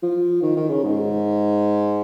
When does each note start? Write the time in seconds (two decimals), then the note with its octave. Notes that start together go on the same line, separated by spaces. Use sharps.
0.03 F3
0.42 D#3
0.56 D#3
0.69 C#3
0.83 G#2